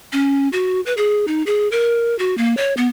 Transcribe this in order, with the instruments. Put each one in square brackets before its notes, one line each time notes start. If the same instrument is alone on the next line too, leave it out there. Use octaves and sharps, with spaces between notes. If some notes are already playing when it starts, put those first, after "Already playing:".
[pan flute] C#4
F#4
B4
G#4
D#4
G#4
A#4
F#4
A#3
C#5
B3